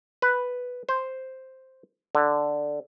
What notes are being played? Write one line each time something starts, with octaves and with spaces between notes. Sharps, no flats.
B4
C5
D3